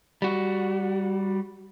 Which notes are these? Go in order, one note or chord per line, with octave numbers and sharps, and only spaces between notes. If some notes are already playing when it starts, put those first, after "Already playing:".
G3 F#4